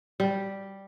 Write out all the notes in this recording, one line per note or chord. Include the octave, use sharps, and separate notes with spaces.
G3